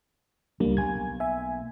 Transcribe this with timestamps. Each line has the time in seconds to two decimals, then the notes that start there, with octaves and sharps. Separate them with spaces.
0.60 C#2 G3 A#3 D4
0.77 B1 A#3 G#5 G#6
1.20 E5 G#5